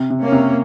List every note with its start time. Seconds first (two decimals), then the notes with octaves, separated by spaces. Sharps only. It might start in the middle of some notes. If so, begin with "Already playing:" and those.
Already playing: C3
0.10 C3
0.21 A#3 C#4
0.32 C3